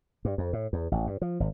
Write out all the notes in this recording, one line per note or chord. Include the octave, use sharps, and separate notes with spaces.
G2
F2
A2
E2
A1
G2
F3
G#1